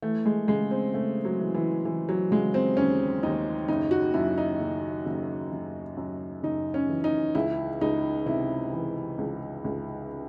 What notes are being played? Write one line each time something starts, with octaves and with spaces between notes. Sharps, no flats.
E3 A3
G#3
C#3 G#3
C4
C#3 A3
F#3
E3
E3
E3
F#3
C#3 G#3
C4
D#2 C#4
D#2 D#4
F#1 D#4
F#4
F#2 E4
D#4
F#1
F#1
F#1
F#2
F#1 D#4
C#4
E3
D#4
C#2 E4
C#2 D#4
C3 E4
E3
C#2
C#2